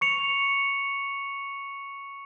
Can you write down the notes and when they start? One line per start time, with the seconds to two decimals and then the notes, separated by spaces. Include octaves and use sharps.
0.01 C#6 C#7 F7